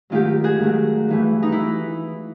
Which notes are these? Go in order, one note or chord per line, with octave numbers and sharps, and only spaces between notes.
G#2 D#3 F#3 A3 F4 G4
F#4 G#4
G#2 D#3 F#3 A3
G2 E3 A3
D#4
E4
E3